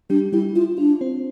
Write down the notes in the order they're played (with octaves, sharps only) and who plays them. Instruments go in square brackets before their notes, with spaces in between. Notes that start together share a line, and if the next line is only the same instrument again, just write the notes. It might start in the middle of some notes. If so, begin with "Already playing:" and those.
[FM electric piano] G3 G4 [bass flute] D4
[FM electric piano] G3 G4 [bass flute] E4
[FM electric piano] E4 [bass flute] F4
[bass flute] D4 [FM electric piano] F4
[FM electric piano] C4 C5